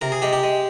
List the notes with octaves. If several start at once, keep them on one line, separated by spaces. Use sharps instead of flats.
C3 A#4
G#4
G#3 G4
G4
G#3